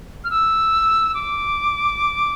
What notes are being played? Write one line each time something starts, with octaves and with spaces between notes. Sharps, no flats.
F6
E6
D6